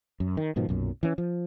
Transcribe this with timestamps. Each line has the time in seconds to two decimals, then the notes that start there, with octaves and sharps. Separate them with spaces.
0.20 F#2
0.37 D#3
0.56 G#2 B2 D#3 F3
0.69 B1 F#2 A#2
1.03 E3 C#4
1.18 F3